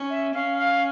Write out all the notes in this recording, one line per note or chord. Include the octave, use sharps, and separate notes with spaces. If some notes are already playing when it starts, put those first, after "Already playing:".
Already playing: C#4
E5
C#4 F5
F5